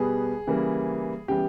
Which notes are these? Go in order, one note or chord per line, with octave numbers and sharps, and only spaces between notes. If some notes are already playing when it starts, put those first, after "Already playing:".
Already playing: B2 G3 B3 G#4
C#3 E3 G3 A#3
C#3 E3 G3 B3 G4